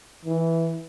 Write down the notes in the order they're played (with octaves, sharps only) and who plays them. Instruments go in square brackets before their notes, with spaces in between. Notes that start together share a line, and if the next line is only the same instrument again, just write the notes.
[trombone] E3